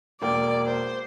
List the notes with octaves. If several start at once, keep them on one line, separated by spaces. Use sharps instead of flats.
E1 A#3 D5 G5
C5